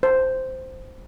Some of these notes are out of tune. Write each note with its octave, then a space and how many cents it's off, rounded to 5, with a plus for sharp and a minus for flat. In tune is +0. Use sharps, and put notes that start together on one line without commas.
C5 -5